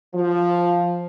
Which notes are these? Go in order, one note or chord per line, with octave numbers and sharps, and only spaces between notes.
F3